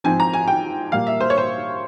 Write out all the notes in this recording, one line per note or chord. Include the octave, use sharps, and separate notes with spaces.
G#2 F3 C4 G#5
A#5
G#5
G5
A#2 G3 A#3 F5
E5
C5
C#5
C5